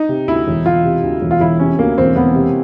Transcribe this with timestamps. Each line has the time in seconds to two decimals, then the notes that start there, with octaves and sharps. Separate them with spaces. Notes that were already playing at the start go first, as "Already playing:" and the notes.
Already playing: D#4
0.09 C3
0.28 D2 E4
0.47 E1
0.65 E1 F4
0.84 C3
1.03 D2
1.21 E1
1.31 F4
1.40 E1 E4
1.60 C3 C#4
1.79 D2 A#3
1.98 E1 C4
2.16 E1 B3
2.35 C3